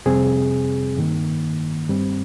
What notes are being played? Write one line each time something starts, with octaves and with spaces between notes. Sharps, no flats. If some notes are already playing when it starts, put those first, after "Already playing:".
F2 C3 G3 C4 G#4
G2 D#3 A#3
G2 G3 C4